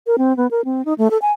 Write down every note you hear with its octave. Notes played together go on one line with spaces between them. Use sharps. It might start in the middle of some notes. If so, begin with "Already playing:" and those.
A#4
C4
B3
A#4
C4
D#4
A3
A4
G#5